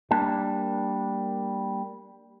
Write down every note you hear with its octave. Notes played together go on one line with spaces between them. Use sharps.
G3 A#3 D4 A5